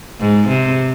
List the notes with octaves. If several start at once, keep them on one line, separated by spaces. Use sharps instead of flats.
G#2
C3